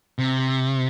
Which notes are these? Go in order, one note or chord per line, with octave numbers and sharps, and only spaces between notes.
C3